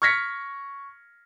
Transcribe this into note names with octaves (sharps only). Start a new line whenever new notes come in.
C#6 F6 G#6 A#6 B6 C#7